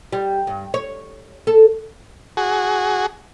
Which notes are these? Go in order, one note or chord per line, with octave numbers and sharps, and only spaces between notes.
G3
G2
C#5
A4
F#4 G#4